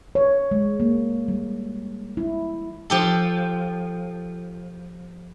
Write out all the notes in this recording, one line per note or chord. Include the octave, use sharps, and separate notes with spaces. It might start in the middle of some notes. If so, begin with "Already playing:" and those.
C#5
G#3
A#3
G3
E4
F3 G4 A4